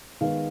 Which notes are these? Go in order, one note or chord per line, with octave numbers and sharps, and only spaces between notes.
D#3 G#3 B3 F5